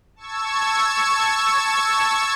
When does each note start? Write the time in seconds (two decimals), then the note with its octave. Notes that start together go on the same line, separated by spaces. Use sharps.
0.16 A5 C#6 E6 G#6